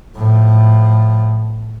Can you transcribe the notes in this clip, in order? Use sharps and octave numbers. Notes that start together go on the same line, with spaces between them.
A2 F3